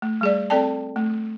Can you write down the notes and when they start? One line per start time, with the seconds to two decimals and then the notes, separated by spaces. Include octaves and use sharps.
0.02 A3
0.21 G3 G#4 D5
0.50 C4 A4 D5 G5 A5
0.96 A3